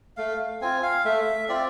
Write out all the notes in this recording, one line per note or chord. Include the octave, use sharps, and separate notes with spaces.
A3 F5
C4 F4 G#5
F5
A3 E5
C4 F4 D5